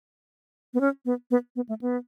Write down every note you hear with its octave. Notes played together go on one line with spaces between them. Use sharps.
B3
C#4
B3
B3
B3
A3
B3